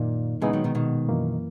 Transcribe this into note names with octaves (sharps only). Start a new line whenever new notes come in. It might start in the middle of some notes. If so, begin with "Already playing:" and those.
Already playing: F#2 A#2 D#3 A#3 D#4
A#2 C#3 E3 G#3 B3 D#4
D#3 F#3
B2 D#3
B2 D#3
F#2 E3 A#3